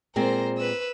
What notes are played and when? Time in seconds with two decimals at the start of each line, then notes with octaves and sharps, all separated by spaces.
0.16 A#2 G#3 C4 A#4 C5
0.58 B4 E6